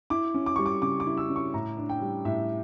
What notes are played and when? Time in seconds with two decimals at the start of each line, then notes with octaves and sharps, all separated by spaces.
0.10 E4 D6
0.34 C#4
0.46 D6
0.56 G3 C#6
0.66 D6
0.82 C#3 D6
1.00 D6
1.06 E4
1.17 E6
1.30 C#4
1.36 C#6
1.54 A2 A#5
1.78 D4
1.89 G5
2.02 G3
2.25 A2 E5